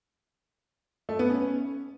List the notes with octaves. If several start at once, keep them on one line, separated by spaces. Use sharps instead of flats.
A3
B3
C#4